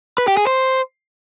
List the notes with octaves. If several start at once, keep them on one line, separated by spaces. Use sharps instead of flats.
B4
G4
G#4
C5